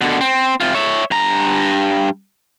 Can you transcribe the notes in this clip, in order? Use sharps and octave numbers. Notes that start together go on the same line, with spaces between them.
B2 D3
C4
C3 F4
C#5 E5
G2 A#5